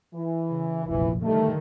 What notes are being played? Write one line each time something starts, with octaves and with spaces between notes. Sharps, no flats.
E3
C#3
F1 A#1 F#2 E3
D3 D#3 G3 A3